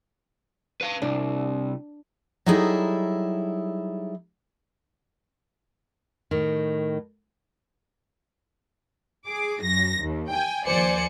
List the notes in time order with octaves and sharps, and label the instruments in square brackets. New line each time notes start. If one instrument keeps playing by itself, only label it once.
[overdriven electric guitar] B4 F5
[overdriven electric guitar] C2 [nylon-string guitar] D4
[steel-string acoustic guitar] F#3 G3 D#4 E4 G#4 A4
[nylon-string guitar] A2 D#3
[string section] G#4 D6
F#2 A#6
D#2
G5 G#5
D#2 F3 C5 D5 G#5 C#7